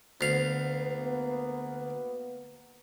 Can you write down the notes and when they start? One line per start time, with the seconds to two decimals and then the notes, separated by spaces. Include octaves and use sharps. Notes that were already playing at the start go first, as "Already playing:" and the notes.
0.21 D2 A#3 B3 F5